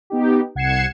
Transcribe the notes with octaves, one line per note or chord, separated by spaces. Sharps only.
B3 D#4 G4
C2 F#5 G#6 C7 C#7 E7